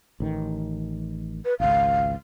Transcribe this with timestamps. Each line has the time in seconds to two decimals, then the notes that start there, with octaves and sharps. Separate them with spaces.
0.20 A1 D#3
1.45 B4
1.60 G#1 C#2 F5